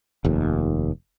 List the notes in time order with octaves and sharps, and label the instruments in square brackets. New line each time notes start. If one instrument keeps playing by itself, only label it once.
[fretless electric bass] F1 D#2